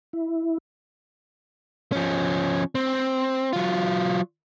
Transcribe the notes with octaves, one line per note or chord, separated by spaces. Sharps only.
E4
F3 C#4
C4
F#3 F4